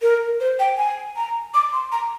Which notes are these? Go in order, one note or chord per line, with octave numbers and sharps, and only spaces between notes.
A#4
C5
G5
G#5
A#5
D6
C6
A#5